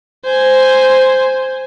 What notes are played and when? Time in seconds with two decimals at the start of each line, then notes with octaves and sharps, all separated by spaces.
0.25 C5 G#5